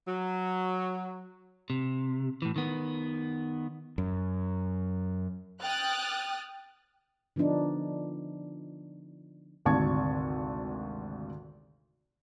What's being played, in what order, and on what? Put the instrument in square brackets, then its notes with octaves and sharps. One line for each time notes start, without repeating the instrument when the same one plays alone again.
[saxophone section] F#3
[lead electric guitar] C3
A2 E3
D#3 B3
[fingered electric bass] F#2
[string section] G5 D#6 F6 F#6 A6
[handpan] D3 F3 B3 D4 D#4
[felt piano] G#1 D2 C3 A5 C#6 G#6